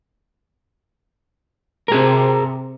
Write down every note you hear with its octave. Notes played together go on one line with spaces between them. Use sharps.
C3 G#4 A#4